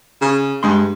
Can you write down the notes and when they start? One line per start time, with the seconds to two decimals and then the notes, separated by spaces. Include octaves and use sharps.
0.21 C#3
0.63 G2 G#3 C6